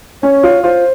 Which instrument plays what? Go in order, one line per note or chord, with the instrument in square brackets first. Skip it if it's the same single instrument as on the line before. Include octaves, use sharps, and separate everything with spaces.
[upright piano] C#4 [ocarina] C#5
[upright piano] F4
[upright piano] F4 [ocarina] C5